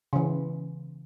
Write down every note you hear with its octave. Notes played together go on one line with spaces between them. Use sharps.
C#3 E3